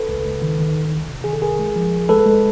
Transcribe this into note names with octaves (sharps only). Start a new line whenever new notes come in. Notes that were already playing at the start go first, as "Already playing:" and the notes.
Already playing: A4 B4
C#2
C#2
D#3
D#3
C#2
C#2
C3
D#3 G#4
A4
C2 G#4 A#4
G#3
F3
C2
G#3 A4 B4
G#3